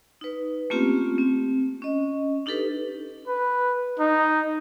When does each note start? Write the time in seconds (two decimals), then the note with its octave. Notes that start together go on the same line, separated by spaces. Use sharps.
0.21 D#4 B4
0.70 A3 A#3 C4 C#4 F4 G4
1.18 C4
1.82 C#4 D#5
2.46 D4 D#4 G4 A4 B4
3.27 B4
3.99 D#4